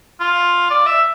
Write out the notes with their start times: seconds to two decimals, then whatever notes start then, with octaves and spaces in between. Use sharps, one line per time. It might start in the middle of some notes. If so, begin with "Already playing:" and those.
0.20 F4
0.71 D5
0.86 E5